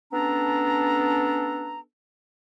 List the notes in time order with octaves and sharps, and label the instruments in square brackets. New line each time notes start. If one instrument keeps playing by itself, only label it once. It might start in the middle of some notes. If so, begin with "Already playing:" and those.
[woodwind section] B3 C#4 D4 A4 A#5